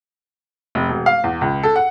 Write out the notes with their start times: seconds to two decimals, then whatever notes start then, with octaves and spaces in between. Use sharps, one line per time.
0.75 F1
0.89 E1
1.06 F5
1.24 E2
1.41 C#2
1.63 A4
1.76 F#5